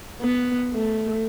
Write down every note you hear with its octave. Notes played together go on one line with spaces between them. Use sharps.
B3
A3